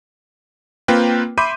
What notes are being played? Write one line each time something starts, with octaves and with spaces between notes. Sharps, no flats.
A#3 C4 F4 A#4 B4 G5
E5 B5 C6 D6 G6 D#7